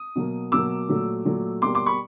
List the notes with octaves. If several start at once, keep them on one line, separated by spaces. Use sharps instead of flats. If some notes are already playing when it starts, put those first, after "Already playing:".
Already playing: D#6
B2 F#3 A#3
B2 F#3 A#3 D6 E6
A#2 F#3 A3
A#2 F#3 A3
B2 G3 A#3 C6 D6
C6 D6
B5 C#6